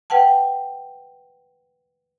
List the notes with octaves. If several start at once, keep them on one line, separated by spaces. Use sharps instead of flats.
B4 F#5 G5 A5